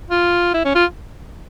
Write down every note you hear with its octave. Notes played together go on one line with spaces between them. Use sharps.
F4
E4
C#4
F4